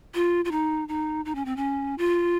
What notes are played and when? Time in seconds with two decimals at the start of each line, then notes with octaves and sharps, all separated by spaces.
0.15 F4
0.45 F4
0.51 D#4
0.88 D#4
1.25 D#4
1.35 C#4
1.45 C4
1.57 C#4
1.98 F4